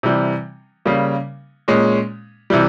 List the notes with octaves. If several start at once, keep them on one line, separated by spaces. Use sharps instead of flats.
C3 E3 G3
C#3 G3 A#3
A#2 G#3 C#4
C3 E3 G3